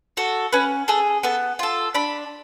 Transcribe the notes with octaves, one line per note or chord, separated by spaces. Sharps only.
F#4 A4
C#4 B4
G#4 A4
B3 A4
F4 A4
D4 B5